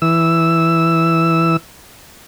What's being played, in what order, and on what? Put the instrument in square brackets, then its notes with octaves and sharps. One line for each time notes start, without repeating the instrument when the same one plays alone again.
[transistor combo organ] E3 E6